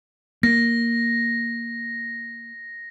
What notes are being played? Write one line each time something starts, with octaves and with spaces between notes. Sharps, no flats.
A#3 A#6